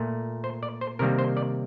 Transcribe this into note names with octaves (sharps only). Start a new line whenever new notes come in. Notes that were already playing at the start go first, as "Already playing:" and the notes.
Already playing: A#2 A3
C5
D5
C5
C3 D#3 G3 A#3 A#4
C5
D5